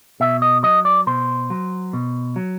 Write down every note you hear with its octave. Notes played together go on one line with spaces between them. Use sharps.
B2 E5
D#5
F#3 D#5
D5
B2 C5
F#3
B2
F#3